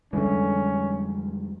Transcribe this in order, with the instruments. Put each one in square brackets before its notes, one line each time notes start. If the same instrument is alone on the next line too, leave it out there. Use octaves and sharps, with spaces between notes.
[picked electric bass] F2 G3 G#3 [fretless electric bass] D3 E3 [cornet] C#4